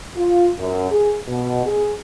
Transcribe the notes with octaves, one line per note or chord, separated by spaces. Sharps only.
F4
F#2
G#4
B2
G#4